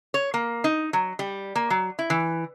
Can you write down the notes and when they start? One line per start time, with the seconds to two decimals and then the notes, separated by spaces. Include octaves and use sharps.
0.14 C#5
0.34 A#3
0.64 D#4
0.93 F#3
1.19 G3
1.55 A#3
1.70 F#3
1.99 E4
2.10 E3